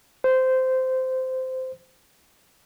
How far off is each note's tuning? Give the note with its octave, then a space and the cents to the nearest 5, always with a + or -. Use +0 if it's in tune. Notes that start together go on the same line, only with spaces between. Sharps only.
C5 -15